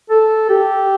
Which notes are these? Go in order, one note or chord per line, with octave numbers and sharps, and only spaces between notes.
A4
G4